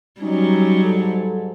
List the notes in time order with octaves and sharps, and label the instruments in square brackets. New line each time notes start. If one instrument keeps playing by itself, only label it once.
[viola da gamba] F#3 G3 [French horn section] C#4 D#4
[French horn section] G#2 A4